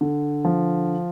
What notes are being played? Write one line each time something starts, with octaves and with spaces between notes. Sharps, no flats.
D3
F3